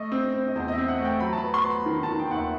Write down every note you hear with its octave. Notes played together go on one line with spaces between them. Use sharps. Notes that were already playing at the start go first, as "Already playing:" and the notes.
Already playing: A3 D#5
C4
C4
D#5
E2 C5
D#5
E5
C4
F#5
A3
G5
F#3 B5
A5
B5
B3
C6
B3
B5
D#3 B5
A5
D#3
G5
D#2 F#5
E5